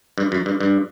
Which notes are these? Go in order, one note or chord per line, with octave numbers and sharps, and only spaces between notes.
G2
F#2
G2
G2